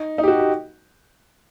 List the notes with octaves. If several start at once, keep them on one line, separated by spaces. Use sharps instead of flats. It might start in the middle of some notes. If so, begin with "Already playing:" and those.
Already playing: D#4
D#4
G4
F#4
G4